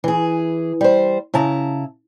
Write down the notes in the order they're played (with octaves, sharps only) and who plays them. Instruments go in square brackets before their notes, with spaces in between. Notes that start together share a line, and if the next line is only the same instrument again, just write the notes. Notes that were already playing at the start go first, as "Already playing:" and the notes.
[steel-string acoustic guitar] E3 G#4
G3 C5
C#3 E4 A5 A#5